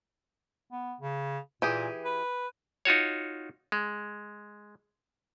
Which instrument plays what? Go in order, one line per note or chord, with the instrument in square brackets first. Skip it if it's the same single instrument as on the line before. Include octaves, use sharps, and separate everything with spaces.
[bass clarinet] B3
C#3
[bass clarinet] A#2 [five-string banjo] E3 G4 G#4
[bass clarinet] B4
[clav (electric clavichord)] D#4 F4 F#4 C#5
G#3